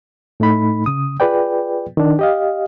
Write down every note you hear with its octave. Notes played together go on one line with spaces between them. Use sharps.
A2 A3 D#4 B5
C#3 D#6
F4 G#4 B4 D5 G5
D#3 D4
G4 D#5 F5